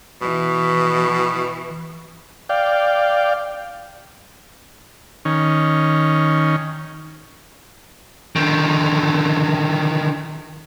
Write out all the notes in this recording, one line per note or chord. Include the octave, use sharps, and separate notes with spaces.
B2 E3
D5 F5 G5
D#3 C#4
D3 D#3